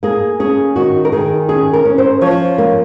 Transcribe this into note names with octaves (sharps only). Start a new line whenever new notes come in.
A#3 G#4
C#4 G#4
D#3 F#4
A#4
D#3 G#4
C#4 G#4
A#4
C#4
C5
F3 C#5
A#3